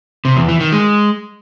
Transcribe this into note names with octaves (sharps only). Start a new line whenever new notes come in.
C3
E2
E3
D#3
G#3